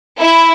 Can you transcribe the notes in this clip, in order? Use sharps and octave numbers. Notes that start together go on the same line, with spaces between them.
E4